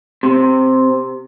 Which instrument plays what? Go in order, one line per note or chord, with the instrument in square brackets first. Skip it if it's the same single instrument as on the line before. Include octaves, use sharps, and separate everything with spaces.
[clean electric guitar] C3